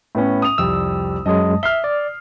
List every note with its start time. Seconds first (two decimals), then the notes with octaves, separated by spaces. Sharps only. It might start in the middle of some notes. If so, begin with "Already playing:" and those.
0.15 A2 B3 C#4
0.42 D#6 F7
0.58 C2 F2 G3 E6
1.26 F#2 F#3 G#3 D#5 A5 D#6
1.63 E5 F6 C7 G7
1.84 D5